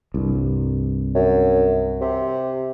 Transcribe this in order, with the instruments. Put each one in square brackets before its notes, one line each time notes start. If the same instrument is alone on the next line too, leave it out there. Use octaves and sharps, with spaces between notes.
[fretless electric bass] C2 G2
[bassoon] F#2
C3